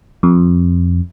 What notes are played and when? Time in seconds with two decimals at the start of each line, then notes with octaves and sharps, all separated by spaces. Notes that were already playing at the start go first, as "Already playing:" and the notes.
0.23 F2